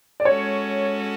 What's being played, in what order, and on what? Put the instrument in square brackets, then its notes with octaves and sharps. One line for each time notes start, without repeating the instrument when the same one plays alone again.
[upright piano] D5
[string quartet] G#3 C#4 F#4 A4 [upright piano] C#5